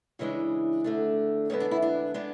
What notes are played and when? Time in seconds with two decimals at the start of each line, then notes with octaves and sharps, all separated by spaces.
0.19 C#3 E3 G#3 D4 C#5
0.84 D2 D3 A3 D4
1.50 E2 D3 G#3 B3 C#5
1.60 D4
1.71 E4
1.82 D4
2.14 G#3 B3 D4